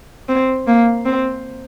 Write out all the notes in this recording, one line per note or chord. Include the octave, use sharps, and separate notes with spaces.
C4
A#3
C4